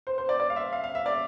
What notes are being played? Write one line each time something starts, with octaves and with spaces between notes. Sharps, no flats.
C5
C5
D5
D5
F5
E5
F5
F5
E5
D5